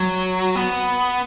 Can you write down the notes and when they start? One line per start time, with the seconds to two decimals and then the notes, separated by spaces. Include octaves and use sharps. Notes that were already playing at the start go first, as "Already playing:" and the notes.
Already playing: F#3
0.56 B3